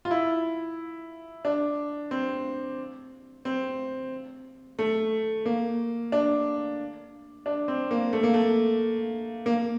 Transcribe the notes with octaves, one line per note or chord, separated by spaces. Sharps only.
F4
E4
D4
C4
C4
A3
A#3
D4
D4
C4
A#3
A3
A#3
A3
A#3